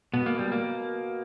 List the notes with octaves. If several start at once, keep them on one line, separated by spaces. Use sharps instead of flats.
B2 B3
A#3
G3
A#3